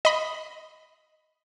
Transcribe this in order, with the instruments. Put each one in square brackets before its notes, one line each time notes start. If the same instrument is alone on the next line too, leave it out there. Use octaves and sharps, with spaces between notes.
[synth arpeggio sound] D#5 B5